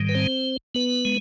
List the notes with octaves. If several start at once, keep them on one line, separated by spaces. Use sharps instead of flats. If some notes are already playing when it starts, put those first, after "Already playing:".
Already playing: G#2 D#3 G3
B4
C4 C5
B3 B4
G#3